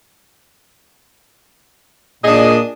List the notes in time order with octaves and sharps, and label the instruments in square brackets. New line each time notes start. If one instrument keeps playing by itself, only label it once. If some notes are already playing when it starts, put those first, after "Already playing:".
[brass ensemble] A#2 [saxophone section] D4 G#4 D#5